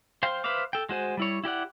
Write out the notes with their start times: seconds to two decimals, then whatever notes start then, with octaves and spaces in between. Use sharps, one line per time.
0.23 C5 F5 G5 C6
0.44 B4 C5 E5 F5 D6
0.73 A4 G5
0.89 G#3 F#4 C5 G#5
1.17 G3 E4 C#5
1.44 E4 G4 D5 F#5